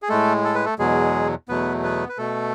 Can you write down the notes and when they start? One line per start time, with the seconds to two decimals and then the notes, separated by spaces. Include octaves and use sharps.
0.02 G#4
0.09 A2 G#3 A3 A4
0.44 A4
0.54 B4
0.65 A3 A4
0.79 E2 B2 F#3 G#3 G#4
1.48 E2 B2 F#3 A3 B3 B4
1.83 B3 B4
2.09 B4
2.18 B2 A3 A4